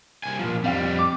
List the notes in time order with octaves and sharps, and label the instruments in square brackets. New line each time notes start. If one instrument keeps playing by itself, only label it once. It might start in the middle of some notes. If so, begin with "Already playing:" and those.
[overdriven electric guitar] C2 G#5
A#2 F3
[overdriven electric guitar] F2 G3 [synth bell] C4 F5 G5
[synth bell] D6